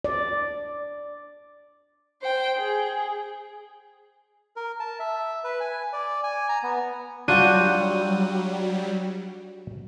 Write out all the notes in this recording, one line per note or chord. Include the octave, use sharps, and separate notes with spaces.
D5
C5 G5
G#4
A#4
A5
E5
B4
G#5
D5
G#5
A#5
B3
F#3 G3 D4 F4 F#4 F#5 G6 D#7